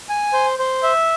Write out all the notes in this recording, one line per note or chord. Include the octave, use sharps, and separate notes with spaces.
G#5
C5
C5
E5